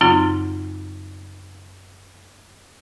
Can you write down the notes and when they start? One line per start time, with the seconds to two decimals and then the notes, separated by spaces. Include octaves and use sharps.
0.01 F#2 C#3 F#3 C4 D#4 F4